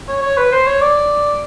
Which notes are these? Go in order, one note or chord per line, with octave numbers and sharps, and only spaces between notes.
C#5
C#5
B4
C5
C#5
D5